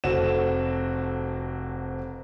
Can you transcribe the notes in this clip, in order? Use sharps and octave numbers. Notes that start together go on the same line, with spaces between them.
F1 C4 F#4 A4 E7